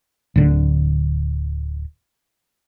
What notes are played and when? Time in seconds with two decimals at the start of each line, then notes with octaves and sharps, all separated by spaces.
0.36 D1 D3